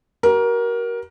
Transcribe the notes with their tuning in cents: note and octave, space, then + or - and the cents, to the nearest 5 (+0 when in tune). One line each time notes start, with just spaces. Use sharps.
F#4 +45 A#4 +20